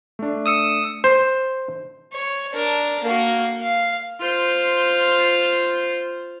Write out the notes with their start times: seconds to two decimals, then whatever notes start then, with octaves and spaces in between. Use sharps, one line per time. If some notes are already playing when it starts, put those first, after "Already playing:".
0.19 A3 D4
0.46 D#6 E6 C#7
1.04 C5
2.13 C#5
2.53 D4 A#4
3.04 A#3 F#4
3.62 F5
4.20 F4 C5